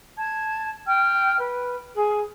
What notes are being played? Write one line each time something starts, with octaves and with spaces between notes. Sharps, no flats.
A5 G#6
G5 F6
B4
G#4